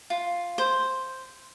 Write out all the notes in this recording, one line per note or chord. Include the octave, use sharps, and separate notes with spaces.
F4
C5